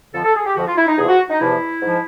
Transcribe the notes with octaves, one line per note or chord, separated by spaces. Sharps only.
F2 D3 F3 A4
A4
G#4
G4
F2 D3 F3 F#4
F4
E4
D#4
E2 C3 F3 G#4
F#4
D#4
E2 C3 F3 E4
G#2 F3